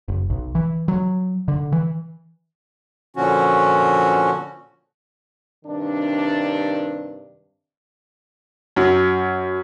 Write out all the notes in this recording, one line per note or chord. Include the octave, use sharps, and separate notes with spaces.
F#1
B1
E3
F#3
D3
E3
A#2 D3 F3 C#4 F#4
G2 C3 D#3 D4
F#2